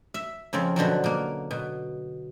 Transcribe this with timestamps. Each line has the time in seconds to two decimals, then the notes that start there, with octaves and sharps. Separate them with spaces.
0.14 E5
0.53 F2 C#3 F3 C4
0.76 B2 D3 F3 F#3
1.04 B2 A#3
1.51 B2